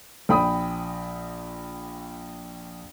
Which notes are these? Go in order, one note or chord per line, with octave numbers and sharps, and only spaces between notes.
A#1 G5 B5 D#6